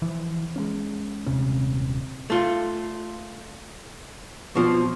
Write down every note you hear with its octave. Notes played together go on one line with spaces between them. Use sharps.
E3 F3
G#3 A#3 C#4
D#1 C3 C#4
A3 F4
B2 F3 C4